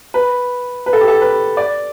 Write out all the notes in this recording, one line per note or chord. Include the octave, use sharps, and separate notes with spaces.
B4
B4
A4
G4
A4
B4
D5